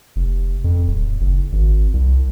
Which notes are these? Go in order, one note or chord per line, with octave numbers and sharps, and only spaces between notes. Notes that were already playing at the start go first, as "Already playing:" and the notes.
F1
F2
D1
F#1
G#1
C2